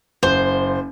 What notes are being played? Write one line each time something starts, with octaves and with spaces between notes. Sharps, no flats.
F#1 C5